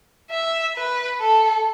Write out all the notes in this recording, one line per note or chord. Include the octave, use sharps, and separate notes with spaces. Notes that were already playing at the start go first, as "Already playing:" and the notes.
E5
B4
A4